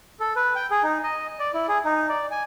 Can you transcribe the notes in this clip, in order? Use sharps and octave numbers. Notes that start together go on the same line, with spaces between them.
A4
B4
G5
G#4
D#4
D#5
D5
E4
G#4
D#4
D5
G#5